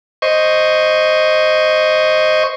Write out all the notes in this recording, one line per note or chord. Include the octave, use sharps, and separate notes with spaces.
C5 D#5 C#6